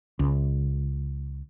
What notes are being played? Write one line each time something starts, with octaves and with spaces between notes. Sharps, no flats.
C#2